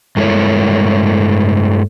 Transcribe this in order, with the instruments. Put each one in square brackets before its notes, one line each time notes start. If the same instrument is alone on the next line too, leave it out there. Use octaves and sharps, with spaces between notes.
[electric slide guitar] G2 G#3 A3 E4 A#4 C#5